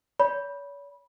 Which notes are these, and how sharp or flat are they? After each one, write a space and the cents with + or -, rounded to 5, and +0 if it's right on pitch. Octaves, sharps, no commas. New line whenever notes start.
C#5 +40 B5 -15